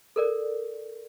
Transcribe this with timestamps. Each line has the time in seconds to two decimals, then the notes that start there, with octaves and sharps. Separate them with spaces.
0.16 A4 A#4 D5